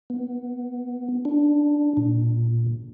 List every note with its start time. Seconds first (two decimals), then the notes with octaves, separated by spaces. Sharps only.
0.10 B3
1.25 D4
1.97 A#2